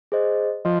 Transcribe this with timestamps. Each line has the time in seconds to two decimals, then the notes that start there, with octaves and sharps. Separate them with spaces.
0.12 G#4 C5 D#5
0.65 F3 D#5